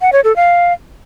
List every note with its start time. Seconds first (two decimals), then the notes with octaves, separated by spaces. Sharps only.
0.01 F#5
0.13 C#5
0.24 A4
0.36 F5